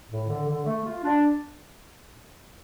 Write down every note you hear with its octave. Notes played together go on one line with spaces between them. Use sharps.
A2
D3
D3
A3
F4
D4